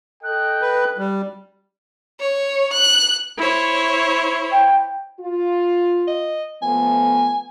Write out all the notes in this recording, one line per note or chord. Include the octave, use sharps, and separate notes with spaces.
A4 D#5 G5 F#6
B4
G3
C#5
F#6
E4 C5 C#5
G5
F4
D#5
F3 A3 B3 G#5